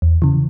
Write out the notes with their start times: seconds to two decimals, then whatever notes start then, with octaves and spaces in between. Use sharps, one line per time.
0.02 E2
0.22 C#3 E3